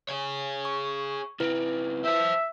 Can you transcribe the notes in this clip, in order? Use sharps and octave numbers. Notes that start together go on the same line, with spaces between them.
G#4 C#5
C#6
C#2 C4 E4 B4
C5 E5 A5